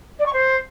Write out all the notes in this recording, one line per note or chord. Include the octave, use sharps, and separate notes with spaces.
D5
C#6
C5